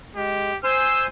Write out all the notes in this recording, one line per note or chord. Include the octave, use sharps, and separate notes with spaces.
G#3 G4
C5 G#5 C6 E6